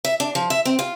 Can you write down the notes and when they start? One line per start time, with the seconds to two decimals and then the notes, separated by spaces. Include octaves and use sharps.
0.05 E5
0.20 D4
0.35 F3
0.50 E5
0.65 C4
0.79 F4